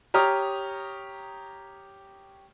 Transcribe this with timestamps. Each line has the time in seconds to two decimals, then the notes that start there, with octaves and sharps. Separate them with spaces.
0.14 G4 C#5 A#5 C#6 D#6 F6